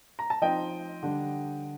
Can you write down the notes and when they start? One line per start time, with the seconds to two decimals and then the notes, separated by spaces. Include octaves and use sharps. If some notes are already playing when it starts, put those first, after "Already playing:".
0.19 A#5
0.30 A5
0.42 F3 C4 D#4 D#5 G5
1.03 D3 G3 D4